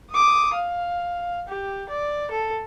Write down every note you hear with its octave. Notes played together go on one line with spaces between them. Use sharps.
D6 D#6
F5
G4
D5
A4